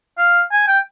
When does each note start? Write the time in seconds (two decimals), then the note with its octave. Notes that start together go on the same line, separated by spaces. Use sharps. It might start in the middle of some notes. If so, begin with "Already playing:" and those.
0.18 F5
0.52 G#5
0.68 G5